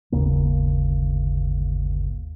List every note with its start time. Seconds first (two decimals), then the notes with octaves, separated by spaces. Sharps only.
0.12 G1 D#2 C#3 A#3